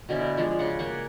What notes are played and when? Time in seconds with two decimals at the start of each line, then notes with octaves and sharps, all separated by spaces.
0.09 B2 D3 C#4 E4
0.37 F3 G#3 D4
0.59 C#3 F#5
0.79 A#3 C#5 F#5